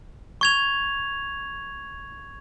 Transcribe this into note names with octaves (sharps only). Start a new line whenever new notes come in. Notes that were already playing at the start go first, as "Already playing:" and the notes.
C#6 G#6 F7